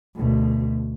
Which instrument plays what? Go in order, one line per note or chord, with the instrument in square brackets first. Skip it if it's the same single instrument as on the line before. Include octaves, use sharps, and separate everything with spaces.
[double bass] D2 B2